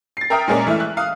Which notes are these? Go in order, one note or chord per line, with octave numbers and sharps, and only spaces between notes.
A6 C7
A#4 E5 G5 A#5 D#6 F6
A#2 G#3 C#4 G#4 A#4 D5
E3 A3 E4 E5 F6
F#6
F5 D#6